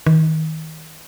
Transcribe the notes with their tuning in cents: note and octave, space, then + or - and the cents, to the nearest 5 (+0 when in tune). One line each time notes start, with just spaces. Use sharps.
D#3 +25